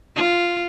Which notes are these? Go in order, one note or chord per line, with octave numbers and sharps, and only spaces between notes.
F4